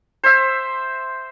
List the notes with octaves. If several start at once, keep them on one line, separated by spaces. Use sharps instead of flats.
C5 E5